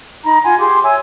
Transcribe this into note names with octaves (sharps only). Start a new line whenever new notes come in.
D#4 A#5 B5
F4 F#5 G#5 C6
G4 G#4 C6 D6
C#5 E5 G#5 E6